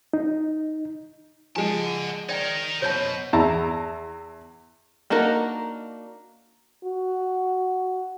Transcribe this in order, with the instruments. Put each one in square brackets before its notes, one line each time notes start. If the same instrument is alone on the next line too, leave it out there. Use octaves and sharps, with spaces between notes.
[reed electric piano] D#4
[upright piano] F3 G#3 D7 [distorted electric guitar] F#5 A5 [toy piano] G#5
[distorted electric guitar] D#4 A#4 [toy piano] D5 G5
[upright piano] F#1 G6 [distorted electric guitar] B2 [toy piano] C#5 A5
[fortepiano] E2 E4 A5 A#5
[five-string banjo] A#3 D4 D#4 F#4 A#4
[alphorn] F#4